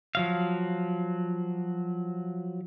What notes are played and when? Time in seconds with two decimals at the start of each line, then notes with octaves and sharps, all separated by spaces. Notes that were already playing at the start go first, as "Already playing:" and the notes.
0.15 F3 F#3 F5